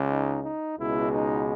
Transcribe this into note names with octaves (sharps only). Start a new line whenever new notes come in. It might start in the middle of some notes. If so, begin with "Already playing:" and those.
Already playing: C#2 C#3 G#3
D#4
D#4
C#2 B2 G#3 B3 E4
D#4